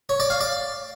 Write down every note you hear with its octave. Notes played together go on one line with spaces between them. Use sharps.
C#5
D5
F5
D5